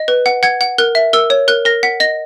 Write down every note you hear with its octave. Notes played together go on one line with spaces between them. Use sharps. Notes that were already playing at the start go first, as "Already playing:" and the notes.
Already playing: D#5
B4
F#5
F#5 G#6
F#5
A#4 F#6
E5
A#4 E6
C#5
A#4 F#6
A#4 A#6
F#5 B6
D#5 A#6